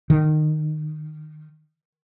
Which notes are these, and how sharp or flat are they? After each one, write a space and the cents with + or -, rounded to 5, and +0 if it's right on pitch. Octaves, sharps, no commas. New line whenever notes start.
D#3 -20